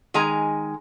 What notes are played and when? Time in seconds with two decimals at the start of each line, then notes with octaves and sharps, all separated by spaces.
0.14 D#3 G#3 G#4 G#5 A#5